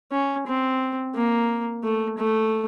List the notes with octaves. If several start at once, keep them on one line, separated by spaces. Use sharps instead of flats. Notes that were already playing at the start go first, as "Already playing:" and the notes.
C#4
C4
A#3
A3
A3